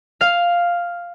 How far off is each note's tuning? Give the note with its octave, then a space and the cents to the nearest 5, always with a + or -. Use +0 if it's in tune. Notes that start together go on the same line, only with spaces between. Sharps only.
F5 +0